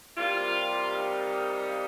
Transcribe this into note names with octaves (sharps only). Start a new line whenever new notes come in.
C3 G3 A#3 F4
D#4